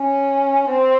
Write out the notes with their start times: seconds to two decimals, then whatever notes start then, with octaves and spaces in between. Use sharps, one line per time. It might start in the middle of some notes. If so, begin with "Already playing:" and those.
Already playing: C#4
0.69 C4